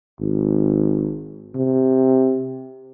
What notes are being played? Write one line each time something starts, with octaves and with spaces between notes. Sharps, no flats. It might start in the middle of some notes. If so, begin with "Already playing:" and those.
G#1
C3